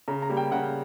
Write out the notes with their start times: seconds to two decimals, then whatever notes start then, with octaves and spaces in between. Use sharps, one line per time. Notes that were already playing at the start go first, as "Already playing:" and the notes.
0.08 C#3 A#5
0.22 A#5
0.29 G3 A#3
0.37 G5
0.51 C#3 F#5